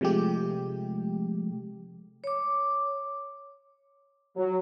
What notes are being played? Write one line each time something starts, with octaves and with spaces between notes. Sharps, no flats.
C3 F3 G#3 A3 G4
C#5 D6
F#3